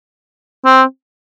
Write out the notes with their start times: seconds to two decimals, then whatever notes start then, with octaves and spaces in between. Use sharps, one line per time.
0.65 C4